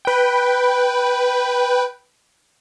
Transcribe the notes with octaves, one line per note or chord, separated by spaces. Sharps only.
B4 G5